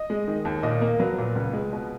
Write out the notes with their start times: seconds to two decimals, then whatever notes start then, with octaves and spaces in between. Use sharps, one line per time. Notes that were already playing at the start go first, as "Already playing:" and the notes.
Already playing: D#5
0.10 G#3
0.28 D#3
0.45 D#2
0.63 A#2 D#5
0.81 A#3
0.99 F#3 B4
1.18 A#2
1.36 C#2
1.53 G#3
1.73 B2